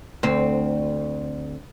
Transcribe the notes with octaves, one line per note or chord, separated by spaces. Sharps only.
D2 C4